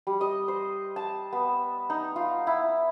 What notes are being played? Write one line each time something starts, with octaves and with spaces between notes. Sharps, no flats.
G3
D#5
C5
A5
B3
D#4
F4
E4